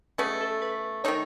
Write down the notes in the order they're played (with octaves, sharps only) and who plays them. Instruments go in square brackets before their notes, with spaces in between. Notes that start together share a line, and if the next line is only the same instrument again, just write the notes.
[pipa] B2 A3 C#4 G#4 [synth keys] B4
[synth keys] A4
B4
[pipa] D#3 A3 D#4 [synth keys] C#5